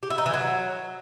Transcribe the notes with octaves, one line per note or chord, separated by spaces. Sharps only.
G4
E4
D#4
E3
F#3